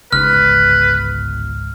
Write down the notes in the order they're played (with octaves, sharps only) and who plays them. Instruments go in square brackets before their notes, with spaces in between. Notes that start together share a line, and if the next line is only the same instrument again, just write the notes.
[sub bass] G1 [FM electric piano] C#2 G#2 [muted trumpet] B4 [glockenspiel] F6